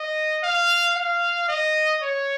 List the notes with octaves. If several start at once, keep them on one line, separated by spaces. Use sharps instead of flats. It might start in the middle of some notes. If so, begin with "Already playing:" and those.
Already playing: D#5
F5
F5
D#5
C#5